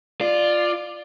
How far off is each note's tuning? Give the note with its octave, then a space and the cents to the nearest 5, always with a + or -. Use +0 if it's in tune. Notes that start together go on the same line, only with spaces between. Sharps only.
F4 +0 D5 +20